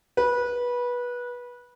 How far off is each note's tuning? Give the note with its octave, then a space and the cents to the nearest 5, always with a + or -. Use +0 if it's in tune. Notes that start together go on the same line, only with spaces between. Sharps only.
B4 -20